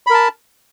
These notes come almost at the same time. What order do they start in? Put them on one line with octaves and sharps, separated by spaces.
B5 A#4 A5